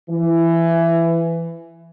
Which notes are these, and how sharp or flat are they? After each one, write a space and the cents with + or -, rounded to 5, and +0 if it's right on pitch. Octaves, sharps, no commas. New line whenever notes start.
E3 +15